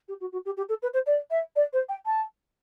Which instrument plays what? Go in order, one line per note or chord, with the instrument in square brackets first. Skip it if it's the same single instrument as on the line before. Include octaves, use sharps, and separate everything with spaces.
[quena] G4
F#4
F#4
G4
G4
A4
B4
C5
D5
E5
D5
C5
G5
A5